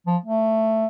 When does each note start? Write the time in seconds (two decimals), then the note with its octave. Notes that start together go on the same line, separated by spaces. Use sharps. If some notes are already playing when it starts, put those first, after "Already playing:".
0.07 F3
0.26 A3